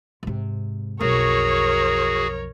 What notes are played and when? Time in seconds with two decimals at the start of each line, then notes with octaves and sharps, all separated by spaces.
0.23 G#2 C3
1.01 B1 F2 F#4 G#4 A#4 C#5